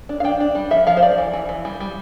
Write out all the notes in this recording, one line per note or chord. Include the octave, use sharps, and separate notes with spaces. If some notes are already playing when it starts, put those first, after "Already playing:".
D4
F5
D4 G5
D4
G3
F3 E5
F3 F5
C5
F3 D5
E3
E3
E3
G3
G3